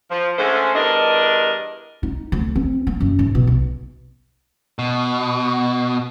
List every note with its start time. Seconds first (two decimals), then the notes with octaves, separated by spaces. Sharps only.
0.11 F3
0.38 D3 G#3 A3 C#4 A4 C5
0.75 E2 G2 D4 A#4 D#5
2.03 D#4
2.32 D2
2.56 C4
2.87 A#3
3.00 F#2
3.19 G#2
3.35 B2
3.47 B1
4.79 B2